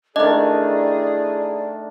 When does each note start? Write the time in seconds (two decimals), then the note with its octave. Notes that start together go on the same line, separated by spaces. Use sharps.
0.16 D#3 A3 D4 E4 G#4 D5 D#5